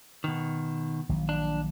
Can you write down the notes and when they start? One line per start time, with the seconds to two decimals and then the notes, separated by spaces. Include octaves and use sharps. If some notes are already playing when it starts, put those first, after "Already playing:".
0.24 B2 D#3
1.09 A#1 D#3 F#3
1.29 D4